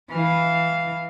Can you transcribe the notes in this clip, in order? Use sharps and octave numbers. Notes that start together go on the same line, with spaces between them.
E3 F5